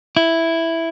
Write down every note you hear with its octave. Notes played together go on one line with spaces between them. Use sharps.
E4